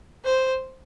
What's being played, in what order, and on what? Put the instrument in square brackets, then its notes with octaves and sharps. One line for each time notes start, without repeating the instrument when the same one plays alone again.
[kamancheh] C5